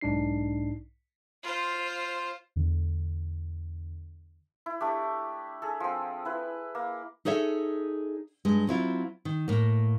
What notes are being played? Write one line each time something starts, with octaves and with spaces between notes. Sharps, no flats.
B1 G#2 D4 D#4 C7
F4 C5
E2 D3
E4
A3 D4 G4
G#4 A4
F3 C4
E4 B4
A#3
D#4 G#4 A4 C#5 E5
G2 G#3
F#3 C4 E4 F4
D#3
A2 A#3